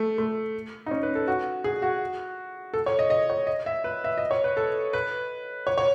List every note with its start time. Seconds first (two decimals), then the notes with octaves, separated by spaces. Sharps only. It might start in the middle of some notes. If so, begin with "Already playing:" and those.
Already playing: A3
0.18 A3
0.86 D#4
0.91 C#4
1.03 B4
1.15 A4
1.28 F#4
1.64 G#4
1.82 F#4
2.74 A4
2.86 C#5
2.99 D#5
3.10 D#5
3.30 C#5
3.47 D#5
3.66 E5
3.84 B4
4.04 E5
4.17 D#5
4.31 C#5
4.44 B4
4.57 A4
4.93 B4
5.67 C#5
5.78 C#5